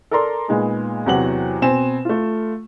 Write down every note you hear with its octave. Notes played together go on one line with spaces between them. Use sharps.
A4 A#4 D5 A#5 C6
A#2 G#3 B3 D#4 G#4
E2 C3 F#3 F#5 G5 F#7
B2 C4 G#5 E7
A3 F4